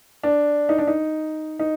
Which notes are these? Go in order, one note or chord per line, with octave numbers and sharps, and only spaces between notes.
D4
D#4
D4
D#4
D#4